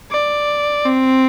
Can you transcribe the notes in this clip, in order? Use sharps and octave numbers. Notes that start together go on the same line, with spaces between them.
D5
C4